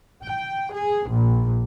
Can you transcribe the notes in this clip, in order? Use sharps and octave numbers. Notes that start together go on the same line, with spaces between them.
G5
G#4
A#1